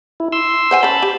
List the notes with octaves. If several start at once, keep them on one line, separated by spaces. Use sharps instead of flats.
E4
C6 E6
C5 F#5 G#5
C#4 C5 A5 B5
G4